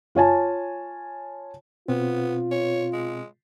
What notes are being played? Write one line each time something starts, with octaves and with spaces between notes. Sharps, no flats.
F4 C#5 G#5 A5
B2 B3 C4 F4
C#5
G#3